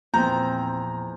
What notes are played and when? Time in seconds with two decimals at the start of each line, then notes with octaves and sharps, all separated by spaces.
0.14 E2 A#2 F3 C4 A#5 G6